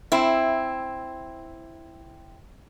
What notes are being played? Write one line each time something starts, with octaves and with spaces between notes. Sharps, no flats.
C4 E4